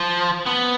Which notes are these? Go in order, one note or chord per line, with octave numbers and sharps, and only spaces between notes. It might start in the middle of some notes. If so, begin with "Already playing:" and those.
Already playing: F3
B3